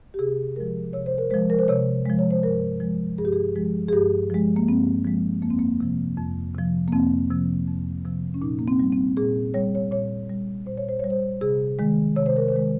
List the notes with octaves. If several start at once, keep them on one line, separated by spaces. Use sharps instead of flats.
G4
C3 G#4
F3 G#3 A#4
C3 C#5
C5
A#4
F3 G#3 C5
A#4
C5
C3 C#5
F3 G#3
C#5
C5
G2 A#4
F3 G#3
G2 G#4
G4
G#4
F3 G#3
G#4
G2 G4
F3 G#3
A#3
G2 C4
F3 G#3
F2 A#3
C4
A#3
C3 F3
F2
C3 F3
A#3
F2 C4
C3 F3
F2
C3 F3
C#4
A#2 D#4
A#3
C4
G3
C4
A#2 G#4
G3 C#5
C#5
A#2 C#5
G3
A#2 C5
C#5
C5
G3 C#5
C5
C3 G#4
D#3 G#3
C3 C#5
C5
A#4
C5
D#3 G#3